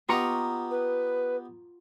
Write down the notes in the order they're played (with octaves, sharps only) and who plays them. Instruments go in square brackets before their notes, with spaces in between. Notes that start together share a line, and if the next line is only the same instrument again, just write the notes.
[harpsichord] B3 G4 D#5 [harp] F4 A#5 C#6
[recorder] B4